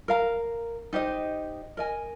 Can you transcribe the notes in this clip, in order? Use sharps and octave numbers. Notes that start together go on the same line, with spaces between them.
A#4 F5 A#5
D#4 G4 C5 D#5
A#4 D#5 G#5